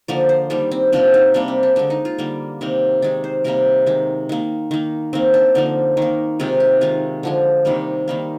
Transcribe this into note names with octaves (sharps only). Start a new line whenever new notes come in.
D3 F3 A#3 D5
C5
D#3 G3 A#3 D4
C4
C3 F3 A#3 D4
D#4
C3 G3 A#3 D4
C4
D4
D3 G#3 D4
D#4
F4
D3 G3 A#3
C3 D#3 A#3
D#3 G#3 D5
C5
C3 G3 A#3 A#4
D#3 G#3
D#3 A#3
D#3 A#3
D#3 A#3 C4
D4
D3 F3 A#3 D#4
D#3 A#3
C3 D#3 G#3 F4
G4
D#3 G#3 F4
D3 F3 G#3
C3 D#3 G3 A#3
D#3 G3 A#3